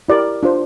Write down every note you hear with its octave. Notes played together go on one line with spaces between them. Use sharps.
E4 G4 A#4 D5
D4 F4 C5